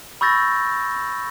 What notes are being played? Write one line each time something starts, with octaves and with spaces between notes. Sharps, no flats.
B5 C#6 E6 G6 A6 A#6